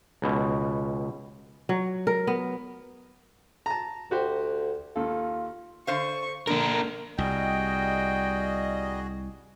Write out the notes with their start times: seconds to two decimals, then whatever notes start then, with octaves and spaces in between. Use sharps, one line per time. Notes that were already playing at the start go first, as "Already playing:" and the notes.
0.22 C#2 B2
1.69 F#3
2.07 A#4
2.27 B3
3.66 A5 A#5
4.11 D2 F#4 G4 C5
4.96 D#2 F4 A4
5.87 D3 C5 F5 C#6
6.47 D3 A#3 D4 A#4
7.18 C2 G3 F#4 G#4 D#5 G5